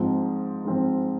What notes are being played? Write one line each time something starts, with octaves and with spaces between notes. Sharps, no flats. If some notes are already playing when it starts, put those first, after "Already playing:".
Already playing: G#2 F3 C4 F4
G#2 F3 C4 F4